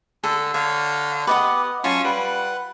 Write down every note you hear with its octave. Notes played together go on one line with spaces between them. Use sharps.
D3 A4
D3 C#5 F5
B3 G4 B4 D#5 F#5
F#3 C#4 F4 A5
G3 B4 F#5